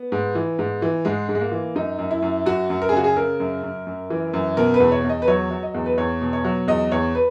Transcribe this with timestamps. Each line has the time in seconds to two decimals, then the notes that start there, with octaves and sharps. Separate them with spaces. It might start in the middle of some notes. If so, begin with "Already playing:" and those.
Already playing: B3
0.12 G#2
0.35 E3
0.59 G#2
0.82 E3
1.05 G#2 G#3
1.29 G#2
1.35 G#3
1.41 A#3
1.52 E3
1.75 F#2 D#4
1.99 F#2
2.11 E4
2.22 F#2
2.46 F#2 F#4
2.70 F#2
2.82 A#4
2.89 G#4
2.92 C#3 F#4
3.04 G#4
3.17 C#3 A#4
3.40 F#2
3.63 F#2
3.87 F#2
4.10 E3
4.34 F#2
4.57 B2 A#4
4.74 B4
4.80 E2
4.92 C#5
5.04 E2
5.09 D#5
5.22 B4
5.28 F#3 C#5
5.51 F#3
5.63 D#5
5.74 E2
5.86 B4
5.98 E2 C#5
6.22 B2
6.33 C#5
6.44 F#3
6.68 E2 D#5
6.92 E2 C#5
7.15 B4